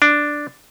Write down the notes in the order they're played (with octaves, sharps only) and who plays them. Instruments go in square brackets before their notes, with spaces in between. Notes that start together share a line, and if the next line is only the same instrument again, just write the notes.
[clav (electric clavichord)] D4